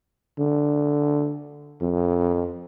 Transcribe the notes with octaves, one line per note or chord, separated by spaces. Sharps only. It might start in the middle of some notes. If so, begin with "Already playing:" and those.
D3
F2